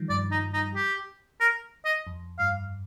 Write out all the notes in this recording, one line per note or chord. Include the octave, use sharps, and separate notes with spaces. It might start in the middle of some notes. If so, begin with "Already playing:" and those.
Already playing: D#3 F3 G3
G2 D5
D#4
D#4
G4
A#4
D#5
F2
G2 F5